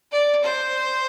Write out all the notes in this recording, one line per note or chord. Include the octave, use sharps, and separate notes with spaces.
D5
C5